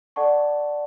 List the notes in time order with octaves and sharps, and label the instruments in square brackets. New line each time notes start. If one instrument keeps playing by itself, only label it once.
[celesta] A4 D5 F#5 A5 C#6